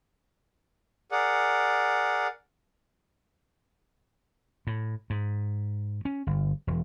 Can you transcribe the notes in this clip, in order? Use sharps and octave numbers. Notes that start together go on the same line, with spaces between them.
G#4 A#4 D5 F#5
A2
G#2
C#4
G1
E1